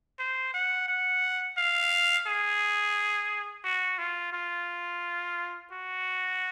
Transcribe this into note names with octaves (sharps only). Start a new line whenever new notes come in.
C5
F#5
F#5
F5
G#4
F#4
F4
F4
F#4